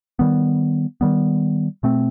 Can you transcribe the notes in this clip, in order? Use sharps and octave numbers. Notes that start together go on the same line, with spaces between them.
D#3 G3 B3
D#3 G3 B3
B2 A3 C4